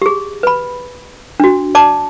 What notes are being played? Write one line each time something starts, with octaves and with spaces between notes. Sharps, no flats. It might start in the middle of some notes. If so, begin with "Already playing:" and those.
G4 G#4
B4 B5
D4 F#4
D5 A5 D6